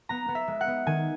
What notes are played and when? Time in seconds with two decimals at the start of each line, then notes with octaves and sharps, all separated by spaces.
0.09 B3 A#5
0.28 B3
0.35 E5
0.48 G#3
0.61 F#5
0.67 B3
0.86 D#3 G#5